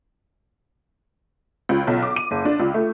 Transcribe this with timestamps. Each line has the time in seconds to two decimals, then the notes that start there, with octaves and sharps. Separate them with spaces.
1.69 C#2
1.87 B1
2.03 D6
2.16 D#7
2.31 F#1
2.45 D4
2.60 C#2
2.74 A3